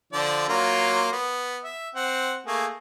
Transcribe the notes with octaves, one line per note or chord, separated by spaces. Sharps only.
D3 F3 D5
F#3 A#3 F4
B3
E5
C4 F#5
A3 A#3 G#4